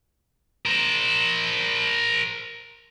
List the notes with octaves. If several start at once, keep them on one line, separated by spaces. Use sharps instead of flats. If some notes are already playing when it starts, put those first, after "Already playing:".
A#4 C5